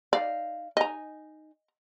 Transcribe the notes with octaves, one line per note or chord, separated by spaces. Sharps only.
D#4 D5 F5
D#4 D#5 G#5 A#5